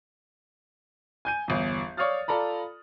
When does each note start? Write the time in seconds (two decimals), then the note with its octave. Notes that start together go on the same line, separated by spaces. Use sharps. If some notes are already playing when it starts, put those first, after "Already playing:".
1.25 G#5 G6 D#7
1.48 G1 E2
1.97 C#5 D5 F5 D#6 F6 A6
2.28 F4 A4 D5 A#5 B5